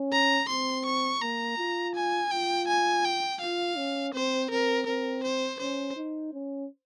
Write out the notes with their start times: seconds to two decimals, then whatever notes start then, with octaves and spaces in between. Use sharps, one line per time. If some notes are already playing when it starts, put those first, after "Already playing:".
Already playing: C#4
0.12 A#5
0.49 C4 C6
0.86 C#6
1.22 A#3 A#5
1.58 F4
1.95 G#5
2.31 F4 G5
2.68 G#5
3.04 G5
3.41 F4 F5
3.77 C#4
4.14 C4 C5
4.50 C4 A#4
4.87 C4 A#4
5.24 C5
5.60 C#4 C5
5.96 D#4
6.33 C#4